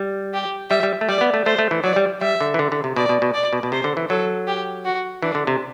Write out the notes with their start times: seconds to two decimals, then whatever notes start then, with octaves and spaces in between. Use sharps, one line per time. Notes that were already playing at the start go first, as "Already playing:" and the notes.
Already playing: G3
0.34 G4
0.70 G3 E5
0.83 G3
1.01 A3
1.09 G3 D5
1.21 B3
1.34 A3
1.46 A3 C5
1.59 A3
1.71 E3
1.84 F#3 D5
1.96 G3
2.21 G3 E5
2.41 D3
2.54 E3
2.59 D3
2.72 D3
2.84 C3
2.96 B2 D5
3.09 B2
3.22 B2
3.34 D5
3.53 B2
3.63 B2
3.72 C3 C5
3.84 D3
3.97 E3
4.09 F#3 A4
4.47 G4
4.85 F#4
5.22 E3 D4
5.35 D3
5.47 C3